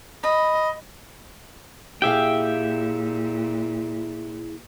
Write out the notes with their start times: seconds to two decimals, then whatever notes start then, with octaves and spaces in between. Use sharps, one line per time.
0.24 D#5 B5
2.02 A#2 E4 G4 G#4 E5 F5 G5